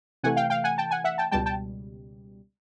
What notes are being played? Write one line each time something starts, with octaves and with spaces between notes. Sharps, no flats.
C3 E3 A3 F#5 G#5
F5 G5
F5 G5
F#5 G#5
G5 A5
F#5 G#5
E5 F#5
G5 A5
C#2 B2 G3 G5 A5
G5 A5